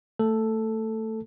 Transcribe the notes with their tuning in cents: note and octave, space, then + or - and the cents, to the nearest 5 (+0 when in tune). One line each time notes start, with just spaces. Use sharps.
A3 +20 A4 +0